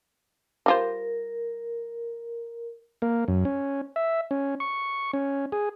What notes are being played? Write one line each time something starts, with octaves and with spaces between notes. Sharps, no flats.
G3 F4 A#4 C5
A#3
F#2
C#4
E5
C#4
C#6
C#4
G#4